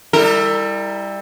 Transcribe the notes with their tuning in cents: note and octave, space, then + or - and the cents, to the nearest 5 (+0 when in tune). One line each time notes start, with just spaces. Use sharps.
G3 +20 E4 +0 A#4 -45